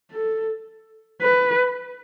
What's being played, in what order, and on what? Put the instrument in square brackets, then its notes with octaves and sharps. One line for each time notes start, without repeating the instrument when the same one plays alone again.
[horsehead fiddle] A4
B4